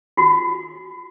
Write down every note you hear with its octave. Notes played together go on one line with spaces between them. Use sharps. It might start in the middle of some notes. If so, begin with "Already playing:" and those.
F4 F#4